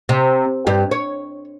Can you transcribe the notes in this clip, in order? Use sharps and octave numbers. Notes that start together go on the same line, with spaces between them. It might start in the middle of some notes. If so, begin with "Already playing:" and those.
C3
G2 G4
C#5